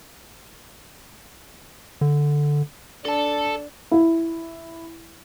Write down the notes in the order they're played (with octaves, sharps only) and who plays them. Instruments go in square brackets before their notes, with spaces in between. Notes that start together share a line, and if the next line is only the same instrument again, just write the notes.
[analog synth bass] D3
[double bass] D4 [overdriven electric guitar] A4 A5
[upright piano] E4